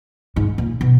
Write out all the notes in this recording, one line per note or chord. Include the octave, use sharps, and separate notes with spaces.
G#2
A#2
B2